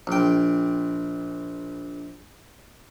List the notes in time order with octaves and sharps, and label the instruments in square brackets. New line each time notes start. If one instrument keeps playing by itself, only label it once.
[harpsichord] A#1 G5